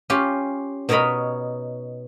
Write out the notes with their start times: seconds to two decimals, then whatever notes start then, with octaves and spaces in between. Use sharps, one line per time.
0.10 C#4 F4 G4
0.89 B2 D#4 A#4 C#5 D#5 B5